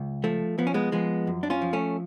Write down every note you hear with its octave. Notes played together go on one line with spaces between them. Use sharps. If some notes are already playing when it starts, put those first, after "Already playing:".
Already playing: C#2
F3 A3
F3 B3
C#4
G#3 B3
F3 G#3 B3
F#2
D4
C#4 F4
F3
A3 C#4